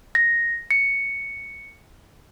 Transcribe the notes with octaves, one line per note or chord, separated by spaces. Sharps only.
A#6
C#7